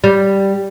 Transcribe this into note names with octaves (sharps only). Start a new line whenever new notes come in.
G3